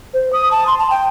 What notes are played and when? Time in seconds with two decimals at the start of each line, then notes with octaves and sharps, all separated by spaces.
0.14 C5
0.33 D#6
0.51 A5
0.67 C6
0.79 A5
0.90 G5